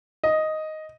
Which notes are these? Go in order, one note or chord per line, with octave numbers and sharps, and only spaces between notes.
D#5